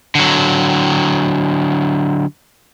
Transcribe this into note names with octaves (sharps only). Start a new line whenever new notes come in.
D3 F#3